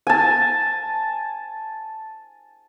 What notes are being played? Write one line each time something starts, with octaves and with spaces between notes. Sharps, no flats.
G#5 A5